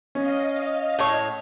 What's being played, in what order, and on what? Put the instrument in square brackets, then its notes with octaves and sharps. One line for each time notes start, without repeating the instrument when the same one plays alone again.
[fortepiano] C#4 [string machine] D#5 F5
[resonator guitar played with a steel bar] A2 C#5